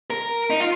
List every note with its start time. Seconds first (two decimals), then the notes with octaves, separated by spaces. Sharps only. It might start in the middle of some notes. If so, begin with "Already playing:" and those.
0.10 A#4
0.50 D#4
0.60 F4